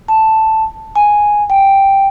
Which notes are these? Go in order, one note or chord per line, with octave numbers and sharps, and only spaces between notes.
A5
G#5
G5